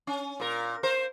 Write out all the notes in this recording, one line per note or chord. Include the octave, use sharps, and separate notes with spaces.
C#4
A#2 A#4
A#4 C5